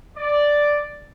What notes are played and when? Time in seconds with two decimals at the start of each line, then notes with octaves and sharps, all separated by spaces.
0.17 D5